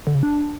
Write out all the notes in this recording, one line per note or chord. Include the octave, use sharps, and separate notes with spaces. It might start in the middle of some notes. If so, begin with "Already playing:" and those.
D3
C#3
D4